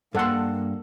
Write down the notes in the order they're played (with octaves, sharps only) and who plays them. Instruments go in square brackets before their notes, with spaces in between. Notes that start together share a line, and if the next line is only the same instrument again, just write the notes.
[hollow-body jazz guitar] G2 C6 [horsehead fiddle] A#3 [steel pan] A4 F#5